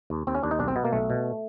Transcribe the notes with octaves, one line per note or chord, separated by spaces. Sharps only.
D#2
D#2 C4
C#4
D#2 D4
D#4
B1 D4
C4
B2 B3
A#3
B1 A3
B2